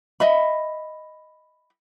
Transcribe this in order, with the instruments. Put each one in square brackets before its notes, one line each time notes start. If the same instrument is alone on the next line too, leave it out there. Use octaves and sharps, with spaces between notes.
[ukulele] D#5 E5 B5